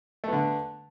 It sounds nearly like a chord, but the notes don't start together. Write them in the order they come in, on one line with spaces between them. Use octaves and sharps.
A3 B3 D3